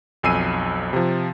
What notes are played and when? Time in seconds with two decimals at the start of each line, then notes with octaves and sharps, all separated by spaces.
0.23 B1 F2 G#5 E6 C7 D#7
0.93 C3 F3